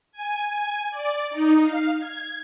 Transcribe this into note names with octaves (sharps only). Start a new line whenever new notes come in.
G#5
D5
D#4
F5
G#6